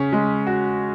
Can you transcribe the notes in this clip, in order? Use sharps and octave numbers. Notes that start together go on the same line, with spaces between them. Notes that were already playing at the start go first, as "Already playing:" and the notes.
Already playing: C#3 C#4
G#3
F#4